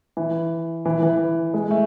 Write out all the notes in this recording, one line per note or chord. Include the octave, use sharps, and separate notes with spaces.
E3
E3
E3
G#3
A3